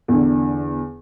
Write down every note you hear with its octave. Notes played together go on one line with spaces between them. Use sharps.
E2 D3